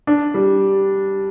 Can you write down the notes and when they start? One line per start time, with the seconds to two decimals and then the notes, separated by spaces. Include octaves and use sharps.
0.07 D4
0.34 G3